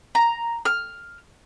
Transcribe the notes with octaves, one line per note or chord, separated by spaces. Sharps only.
A#5
F6